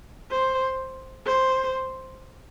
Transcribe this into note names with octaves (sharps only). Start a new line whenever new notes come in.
C5
C5